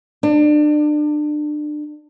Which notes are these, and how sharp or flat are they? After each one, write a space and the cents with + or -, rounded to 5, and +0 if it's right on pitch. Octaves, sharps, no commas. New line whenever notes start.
D4 +30